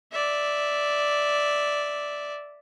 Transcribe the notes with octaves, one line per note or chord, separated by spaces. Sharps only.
D5 E5